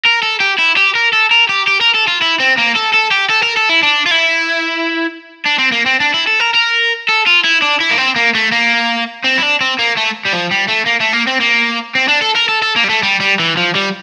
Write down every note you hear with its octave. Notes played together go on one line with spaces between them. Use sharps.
A#4
A4
G4
E4
G4
A#4
A4
A#4
G4
G4
A#4
A4
F4
E4
C4
A#3
A4
A4
G4
A4
A#4
A4
E4
D4
F4
E4
D4
C4
A#3
C4
D4
E4
A4
A#4
A#4
A4
F4
E4
D4
E4
A#3
C4
A#3
A3
A#3
C4
E4
D4
C4
A#3
A3
G3
F3
G3
A3
A#3
A3
A#3
C4
A#3
C4
D4
A4
A#4
A4
A4
A#3
G3
A3
G3
G3
E3
F3
G3